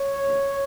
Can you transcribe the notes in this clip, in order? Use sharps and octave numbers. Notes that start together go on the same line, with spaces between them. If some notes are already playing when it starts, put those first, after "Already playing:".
Already playing: C#5
D2 C#3 E3